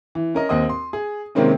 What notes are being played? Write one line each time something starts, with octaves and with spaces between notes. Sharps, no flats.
E3
C#4 A#4 D#5
D#2 C4 D#5 D#6
C6
G#4
C3 D#3 G#3 A#3 C4 C#4